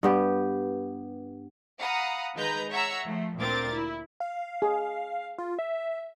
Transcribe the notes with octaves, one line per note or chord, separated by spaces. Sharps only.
G2 B3 G4
F5 F#5 A#5 B5 D#6
D#3 G#3 D#4 B4 A#5 G6
C#5 E5 F#5 A#5 E6
F3 A3
D2 A#2 C4 A#4 D6 A6
E4
F5
G#4
F4
E5